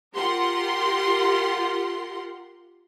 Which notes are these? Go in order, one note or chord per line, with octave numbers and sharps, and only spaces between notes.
F4 G4 A#4 F#5 C6